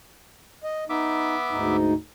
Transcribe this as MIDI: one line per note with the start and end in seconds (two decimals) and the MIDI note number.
0.64 0.84 75
0.89 1.76 59
0.89 1.35 63
0.89 1.76 76
0.89 1.76 86
1.51 1.94 38
1.51 1.94 44
1.51 1.94 63